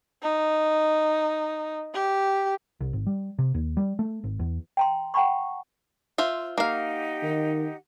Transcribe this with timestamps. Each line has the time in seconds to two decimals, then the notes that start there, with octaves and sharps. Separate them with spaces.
0.23 D#4
1.94 G4
2.80 C2
2.93 G#1
3.07 G3
3.39 C3
3.54 D#2
3.77 G3
3.99 A3
4.24 G#1
4.39 E2
4.77 G5 A#5 C6
5.14 F#5 G5 A5 B5 C#6
6.18 F4 C5 E5
6.58 A#3 D#4 G4 F5 F#5
7.22 D#3